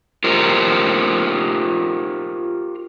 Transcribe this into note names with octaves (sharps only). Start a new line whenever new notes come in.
F4 G4 A#4 C5